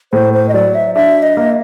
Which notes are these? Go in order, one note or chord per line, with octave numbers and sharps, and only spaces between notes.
A2 C5
C5
D#5
F#3 D5
E5
D4 E5
D#5
A#3